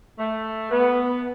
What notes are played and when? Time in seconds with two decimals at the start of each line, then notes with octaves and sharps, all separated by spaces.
0.19 A3
0.71 B3